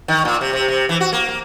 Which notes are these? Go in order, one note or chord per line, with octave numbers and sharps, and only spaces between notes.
D#3
A#2
C3
C3
C3
E3
F#4
A#3
A#3